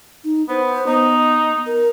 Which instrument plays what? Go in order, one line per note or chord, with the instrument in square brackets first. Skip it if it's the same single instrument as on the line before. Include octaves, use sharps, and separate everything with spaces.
[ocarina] D#4
[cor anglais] B3 [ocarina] C5
[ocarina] B3 [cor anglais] D#4
[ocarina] A#4